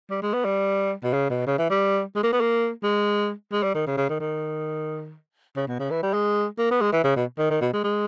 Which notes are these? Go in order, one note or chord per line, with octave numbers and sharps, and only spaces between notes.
G3
G#3
B3
G3
B2
C#3
B2
C#3
E3
G3
G#3
A#3
B3
A#3
G#3
G#3
G3
D#3
C#3
C#3
D#3
D#3
C#3
B2
C#3
E3
G3
G#3
A#3
B3
G#3
E3
C#3
B2
D#3
D#3
B2
G#3
G#3